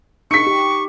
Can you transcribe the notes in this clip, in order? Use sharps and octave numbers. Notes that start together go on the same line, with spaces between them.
D#4 C#6 B6 C#7
G4